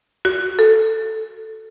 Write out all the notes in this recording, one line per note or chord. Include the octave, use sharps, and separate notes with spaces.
F#4
A4